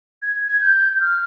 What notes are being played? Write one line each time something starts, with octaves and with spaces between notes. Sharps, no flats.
G#6
G#6
G6
G6
F6